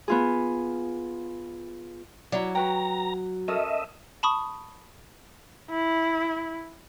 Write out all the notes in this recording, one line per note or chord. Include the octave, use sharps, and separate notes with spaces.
B3 F4 G#4
F#3 E4 D5
F#4 B4 G5 A#5
C#4 A4 A#4 D#5 E5
A5 B5 C#6 D#6
E4